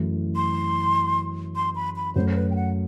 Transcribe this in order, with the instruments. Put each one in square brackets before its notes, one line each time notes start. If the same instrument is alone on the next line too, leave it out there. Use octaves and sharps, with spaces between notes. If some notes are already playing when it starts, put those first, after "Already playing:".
Already playing: [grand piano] F#2 E3 A3 E4
[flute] C6
C6
B5
B5
[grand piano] F#2 F#3 A3 [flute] C5
[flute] C5
B4
G5
F#5